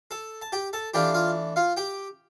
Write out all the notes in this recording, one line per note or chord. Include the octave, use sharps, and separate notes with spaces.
A4 A5
A5
G4 G5
A4 A5
E3 A3 D4 F4 G4 G5
F4 F5
F4 F5
G4 G5